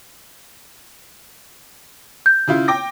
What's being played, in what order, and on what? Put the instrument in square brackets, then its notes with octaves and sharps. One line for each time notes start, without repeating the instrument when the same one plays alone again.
[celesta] G6
[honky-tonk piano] C#3 E4 F4
G5 D6 A#6